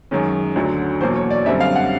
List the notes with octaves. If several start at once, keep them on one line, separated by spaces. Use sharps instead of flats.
F#2 D#3 G#3 C#4
D2 D3 F#3
E2 B2 F#3 A#3 C5
C#5
D5
F#2 D3 G3 C4 E5
F5
F#5